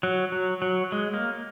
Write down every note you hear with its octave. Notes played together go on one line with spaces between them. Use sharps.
F#3
F#3
F#3
G#3
A#3